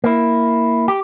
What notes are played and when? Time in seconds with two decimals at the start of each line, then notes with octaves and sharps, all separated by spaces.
0.04 A#3 E4
0.88 G4